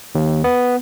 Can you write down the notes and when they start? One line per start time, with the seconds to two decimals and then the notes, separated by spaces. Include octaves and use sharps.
0.15 D#2
0.44 B3